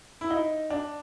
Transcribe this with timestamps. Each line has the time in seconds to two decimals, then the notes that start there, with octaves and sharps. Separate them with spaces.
0.21 E4
0.31 D#4
0.70 D4